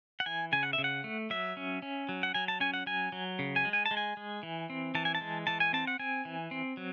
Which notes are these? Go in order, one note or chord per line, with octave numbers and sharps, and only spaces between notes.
F#5
E3 G#5
C#3 G#5
F#5
E5
C#3
F#5
A3
F#3 E5
C#4
C#4
F#3
F#5
F#3 G#5
A5
C#4 G#5
F#5
F#3 G#5
F#3
C#3
G#5
G#3
G#5
A5
G#3
G#5
G#3
E3
C4
E3 A5
G#5
A5
G#3
E3 A5
G#5
C4 A5
F#5
C4 G#5
E3
C4
F#3